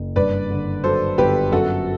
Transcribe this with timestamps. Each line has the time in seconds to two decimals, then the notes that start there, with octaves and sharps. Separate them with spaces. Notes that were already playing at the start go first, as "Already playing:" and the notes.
Already playing: F#1
0.16 G2 B4 D5
0.50 D3
0.84 F#3 A4 C5
1.18 G1 G4 B4
1.52 F#2 F#4 A4